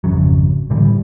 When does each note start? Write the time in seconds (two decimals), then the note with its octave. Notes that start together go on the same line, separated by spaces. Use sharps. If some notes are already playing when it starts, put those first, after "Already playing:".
0.04 G#1 F2 C#3 F#3
0.70 A2 D3 E3 G3